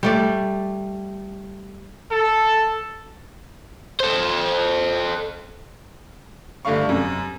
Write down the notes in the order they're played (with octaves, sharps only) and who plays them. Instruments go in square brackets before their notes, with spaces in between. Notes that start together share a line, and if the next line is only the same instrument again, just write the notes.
[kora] G3 A3 D5
[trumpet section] A4
[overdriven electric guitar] A4 C5
[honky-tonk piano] G1 G2 A3 D4 F5 C#6
F#2 C3